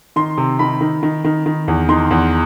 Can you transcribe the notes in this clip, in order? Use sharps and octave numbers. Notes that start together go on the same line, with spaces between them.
D#3 C6
C3
D#3 B5
D#3
D#3
D#3
D#3
E2
D#3 C6
E2